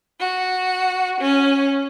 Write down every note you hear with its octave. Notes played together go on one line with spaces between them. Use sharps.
F#4
C#4